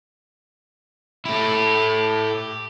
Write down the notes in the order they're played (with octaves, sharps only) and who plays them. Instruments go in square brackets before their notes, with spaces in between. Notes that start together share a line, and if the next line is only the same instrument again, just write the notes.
[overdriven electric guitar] A3 E4 [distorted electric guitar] G4